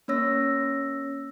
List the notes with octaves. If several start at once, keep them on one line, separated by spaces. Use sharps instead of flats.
A#3 C#4 C#5 E6 A#6